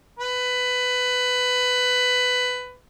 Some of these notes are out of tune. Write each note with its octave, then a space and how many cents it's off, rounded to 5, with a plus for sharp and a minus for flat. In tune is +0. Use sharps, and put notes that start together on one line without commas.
B4 +15